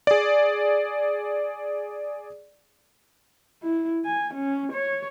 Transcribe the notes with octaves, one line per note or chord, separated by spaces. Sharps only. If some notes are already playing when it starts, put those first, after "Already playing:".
G#4 D5
E4
G#5
C#4
C#5